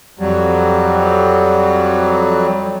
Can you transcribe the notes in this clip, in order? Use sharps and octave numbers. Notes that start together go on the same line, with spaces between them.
F2 F#3 G3